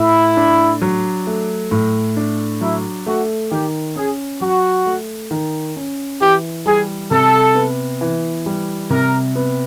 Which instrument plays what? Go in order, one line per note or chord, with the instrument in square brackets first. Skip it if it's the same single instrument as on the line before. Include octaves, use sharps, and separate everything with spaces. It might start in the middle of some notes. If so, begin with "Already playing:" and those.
Already playing: [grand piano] A2 A3 [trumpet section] E4
[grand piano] D4
F#3
A3
A2
D4
[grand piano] F#3 [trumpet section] E4
[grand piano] A3 [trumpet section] F#4
[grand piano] D#3 [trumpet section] G4
[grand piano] C#4 [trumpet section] G#4
[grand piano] F#3 [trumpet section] F#4
[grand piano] A3
D#3
C#4
[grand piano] E3 [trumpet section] G4
[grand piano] G3 [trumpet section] G#4
[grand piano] C3 [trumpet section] A4
[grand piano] B3
E3
G3
[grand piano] C3 [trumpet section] A#4
[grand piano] B3